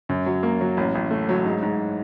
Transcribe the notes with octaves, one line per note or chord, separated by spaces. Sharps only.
F#2
F#3
A#3
F#3
A1
A1
A3
F#3
G#2
G#2